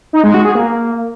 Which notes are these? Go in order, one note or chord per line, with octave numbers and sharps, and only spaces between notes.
D#4
G#3
F#4
G#4
A#3